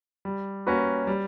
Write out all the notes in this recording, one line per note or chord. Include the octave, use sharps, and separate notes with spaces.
G3
A#3 C#4 F#4 B4
G3